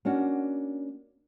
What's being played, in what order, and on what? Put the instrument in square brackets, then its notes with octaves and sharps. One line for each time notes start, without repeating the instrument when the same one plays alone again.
[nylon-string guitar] A#3 C#4 D4 F#4